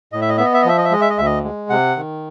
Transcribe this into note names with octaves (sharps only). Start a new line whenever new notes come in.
A2 D#5
E5
D#5
B3 E5
D#5
E5
D#5
F3 E5
D#5
E5
G#3 D#5
E5
D#5
D2 E5
D#5
G#3
C3 F#5
D#3